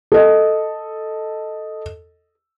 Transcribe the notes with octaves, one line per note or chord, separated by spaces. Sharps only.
A4 D#5